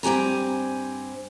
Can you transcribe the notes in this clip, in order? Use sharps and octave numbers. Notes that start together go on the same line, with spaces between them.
G2 C4 G4 G#5 A#5